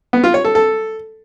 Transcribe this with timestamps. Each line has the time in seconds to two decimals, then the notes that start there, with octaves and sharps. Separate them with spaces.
0.13 B3
0.24 F4
0.34 C#5
0.45 A4
0.55 A4